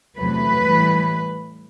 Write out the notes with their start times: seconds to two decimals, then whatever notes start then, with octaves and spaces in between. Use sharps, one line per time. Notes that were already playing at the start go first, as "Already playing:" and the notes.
0.17 E2 C3 F#3 A3 B4
0.64 A2 E3 G3